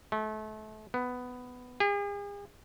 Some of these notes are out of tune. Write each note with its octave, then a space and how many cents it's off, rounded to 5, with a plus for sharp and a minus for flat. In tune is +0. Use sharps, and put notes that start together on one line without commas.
A3 -30
B3 +10
G#4 -45